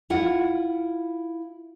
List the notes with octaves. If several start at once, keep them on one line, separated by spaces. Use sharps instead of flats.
E4 F4 F#5